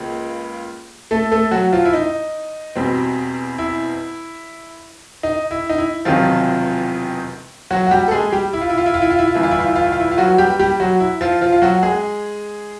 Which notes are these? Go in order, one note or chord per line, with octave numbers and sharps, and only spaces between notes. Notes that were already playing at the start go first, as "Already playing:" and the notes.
Already playing: C#2 C#3 F3 A#3
A3 A4
A3 A4
F#3 F#4
F3 F4
E4
D#4
E2 B2 G3 C4
E4
D#4
E4
D#4
E4
E1 E2 C3 D#3 F3 F#3 F4
F#3 F#4
F#4
G3 G4
A4
G#3 G#4
G3 G4
E4
F4
E4
F4
E4
F4
E4
F4
E4
F4
G1 G2 E3 E4
F4
E4
F4
E4
F4
E4
F4
E4
F4
F#3 F#4
G3 G4
G3 G4
F#3 F#4
E4
F3 F4
F3 F4
F4
F#3 F#4
G#3 G#4